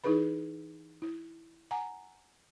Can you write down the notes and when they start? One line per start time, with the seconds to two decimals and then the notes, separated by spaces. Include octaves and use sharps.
0.04 E3 D#4 E4 G#4 B4 B5
1.02 E4
1.71 F#5 G#5 A#5